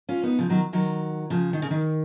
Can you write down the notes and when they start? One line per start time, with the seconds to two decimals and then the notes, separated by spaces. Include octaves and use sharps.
0.09 C#4 F4
0.23 B3 D#4
0.39 C#3 F3
0.50 D#3 F#3
0.73 D#3 F#3
1.30 C#3 F3
1.53 D#3
1.62 C#3
1.70 D#3